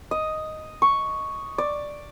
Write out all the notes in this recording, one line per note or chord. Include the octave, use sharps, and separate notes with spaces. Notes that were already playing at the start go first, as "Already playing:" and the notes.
D#5
C#6
D5